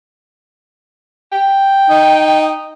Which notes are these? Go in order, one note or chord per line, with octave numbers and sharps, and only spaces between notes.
G5
D#4